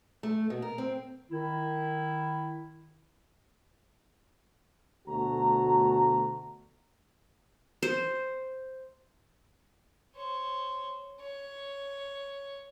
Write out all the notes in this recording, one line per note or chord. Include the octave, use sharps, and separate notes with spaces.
A3
B2
A#4
C4
D#3 E4
D2 B2 A3 F#4 A#5
C5
C5 C#5
C#5